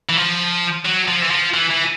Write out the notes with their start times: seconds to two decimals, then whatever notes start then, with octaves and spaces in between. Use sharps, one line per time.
0.09 E3
0.17 F3
0.85 F#3
1.08 F3
1.22 E3
1.31 F3
1.54 E3
1.71 E3